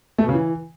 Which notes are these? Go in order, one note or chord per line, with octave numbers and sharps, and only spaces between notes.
A3
B2
C#3
E3